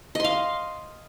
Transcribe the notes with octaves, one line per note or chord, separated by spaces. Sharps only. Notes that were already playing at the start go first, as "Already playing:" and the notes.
D#5 F5 C6